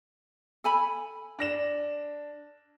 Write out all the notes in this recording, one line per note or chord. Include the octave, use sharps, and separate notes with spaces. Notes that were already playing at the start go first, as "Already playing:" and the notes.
A4 G#5 B5
D4 A#6 E7